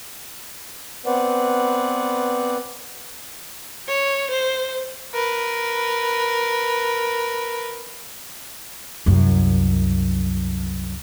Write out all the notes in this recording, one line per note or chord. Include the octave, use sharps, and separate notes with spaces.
B3 C4 B4 C5 D5 F#5
C#5
C5
A#4 B4
C2 F#2